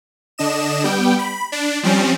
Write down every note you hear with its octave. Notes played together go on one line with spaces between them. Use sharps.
D3 D4 D#5 E7
G3 B3 G5
B5
D4
F3 G3 C4 C#4